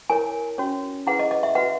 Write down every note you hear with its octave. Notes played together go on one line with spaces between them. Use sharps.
E4 A#4 C#5 G#5
C#4 F#4 C#5
E4 G#4 B4 F#5
D#5
D#5
E5
F#4 B4 F#5